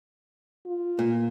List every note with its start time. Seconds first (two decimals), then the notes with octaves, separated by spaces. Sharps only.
0.66 F4
0.99 A#2